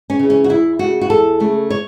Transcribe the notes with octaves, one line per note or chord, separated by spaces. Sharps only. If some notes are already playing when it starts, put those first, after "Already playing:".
C#4
C#3 E3
C#4
F#4
E2 E4
C#3 A3 F#4
F#4
E2 A4
C#3 A3
C#5